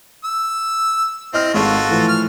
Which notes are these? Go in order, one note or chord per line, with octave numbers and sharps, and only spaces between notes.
E6
C4 E4 D#5 F6
G#1 G#2 F4 F#4 A4
A2 E3 F3
F6